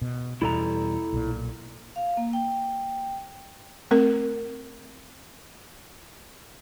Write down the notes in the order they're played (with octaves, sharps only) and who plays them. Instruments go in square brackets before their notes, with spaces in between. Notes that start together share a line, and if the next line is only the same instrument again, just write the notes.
[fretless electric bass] B2
[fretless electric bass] E2 B2 G3 [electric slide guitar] E4 A4 A#5
[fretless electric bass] B1 A#2
[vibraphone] F5
A#3
G5
[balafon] A3 C4 A#4